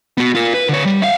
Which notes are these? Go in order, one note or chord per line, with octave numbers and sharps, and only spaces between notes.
B3 F#4
F4 A#4
B4
D3 C#5
G3
E5 F5